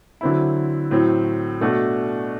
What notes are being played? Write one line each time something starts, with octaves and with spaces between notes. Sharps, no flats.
D3 F#3 C4 E4
A2 F#3 C4
B2 A3 D4 F#4